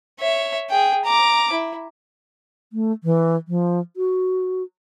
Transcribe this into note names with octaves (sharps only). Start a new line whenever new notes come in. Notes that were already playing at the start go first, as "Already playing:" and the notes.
C#5 E5
G#4 G5
A#5 D6
E4
A3
E3
F3
F#4